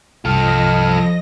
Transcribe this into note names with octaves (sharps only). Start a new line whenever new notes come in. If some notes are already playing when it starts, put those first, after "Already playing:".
C2 G2 F3 F4 A4 D#5 F6 A#6